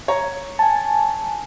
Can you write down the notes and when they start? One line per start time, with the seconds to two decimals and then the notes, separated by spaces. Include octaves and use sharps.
0.08 C#5 A#5
0.59 G#5 A5